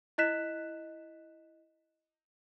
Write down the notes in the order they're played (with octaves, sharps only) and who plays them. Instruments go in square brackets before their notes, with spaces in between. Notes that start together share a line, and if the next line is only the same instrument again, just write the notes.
[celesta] E4 D#5 F#6 B6 E7